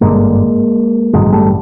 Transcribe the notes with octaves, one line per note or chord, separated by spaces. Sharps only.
G#1 G2 D3 G#3 A#3
A1 G2 D3 F#3 G#3
G3 A3